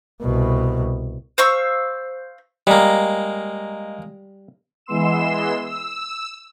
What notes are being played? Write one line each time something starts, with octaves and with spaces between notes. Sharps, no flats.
C2 B2
C5 F5 C#6 E6
G3 G#3 A#3 D#5 A#5
E3 G#3 B3 C6 E6 E7
E6